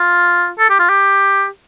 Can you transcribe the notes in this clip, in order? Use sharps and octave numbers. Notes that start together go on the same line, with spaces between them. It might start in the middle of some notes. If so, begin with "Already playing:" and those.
Already playing: F4
A4
G4
F4
G4